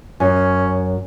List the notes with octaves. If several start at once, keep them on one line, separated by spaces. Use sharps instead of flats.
F#2 C#4